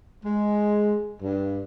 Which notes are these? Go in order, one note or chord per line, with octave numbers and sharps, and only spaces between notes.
G#3
G2